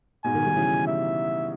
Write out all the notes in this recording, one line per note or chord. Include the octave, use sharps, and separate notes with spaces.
G#2 B2 G#5
B2 D#3
D#3 G3
C#3 E3
E5